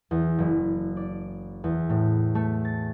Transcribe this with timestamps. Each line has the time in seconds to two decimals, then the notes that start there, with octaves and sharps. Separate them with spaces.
0.11 E2
0.38 F#1
0.97 D5
1.64 E2
1.90 A2
2.35 A3
2.65 A6